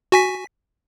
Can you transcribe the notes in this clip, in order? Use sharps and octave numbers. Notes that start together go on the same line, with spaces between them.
F#4 G#5 B6